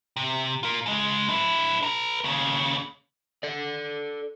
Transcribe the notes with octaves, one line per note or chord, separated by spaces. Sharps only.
C3
F4 A#4
C#3 G#3
D4 E4
B4 A#5
D#2 C#3
A4 D5